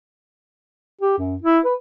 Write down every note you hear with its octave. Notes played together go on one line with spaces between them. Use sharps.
G4
F#2
E4
B4